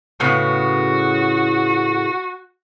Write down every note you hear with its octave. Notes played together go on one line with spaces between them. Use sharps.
A2 C#3 B3 F#4